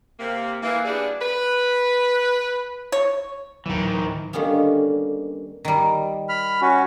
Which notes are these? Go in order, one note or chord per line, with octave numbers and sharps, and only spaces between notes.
C3 A#3
E3 A#3
G3 B3 D4 F#4 G#4 D5
B4
C#5
D1 D#3 E3 F#3
D3 D#3 G3 A#3 B3 C#4
D#3 G3
B5 F6
C#4 F#4